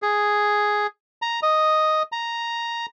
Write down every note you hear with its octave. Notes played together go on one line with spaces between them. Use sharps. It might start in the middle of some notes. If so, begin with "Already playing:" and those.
G#4
A#5
D#5
A#5